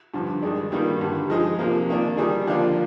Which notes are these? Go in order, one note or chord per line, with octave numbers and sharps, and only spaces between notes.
G2 D3 F3
G2 D#3 G#3 D4
G2 D#3 G3 A#3
G2 D3 G3
F3 G#3 D#4 G#4
C3 F3 A#3
D#3 A#3 D4
D#3 G3 D4 G#4
D3 F3 A#3 D4 F4